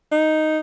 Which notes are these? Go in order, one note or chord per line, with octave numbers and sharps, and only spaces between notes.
D#4